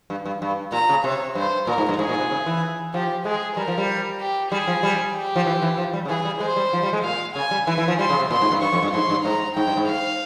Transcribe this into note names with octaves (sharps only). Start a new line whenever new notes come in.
G2
G2
G2
A#2 A#5
C#3
C3 C#5
G2 C5
A#2 A#4
G#2
G2
G#2 G#4
A#2
C3
C#3
E3
F3 G4
G#3 G#4
G3 A#4
F3
G3
G4
G3 G#4
F3
G3
G4
F3
E3
E3
F3
G3
C#3
E3 G#4
G3
G#3 C5
G3
F3
G3
G#3
A#2 F5
C#3 G#5
G3
E3 G#5
E3
F3
G3 C6
C#3
C3
A#2 C6
G#2
G2
G2 C#6
F2
G2
G#2 C6
G2
G#2 A#5
G#2 G5
G2
G#2
F5